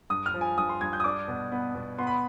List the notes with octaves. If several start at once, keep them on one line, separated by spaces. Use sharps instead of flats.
G2 D#6
F6
F3
G#5
G2 D#6
C6
G2 G#6
G6
D#6
D4 D6
B2
B3
B2
B3 C6
B5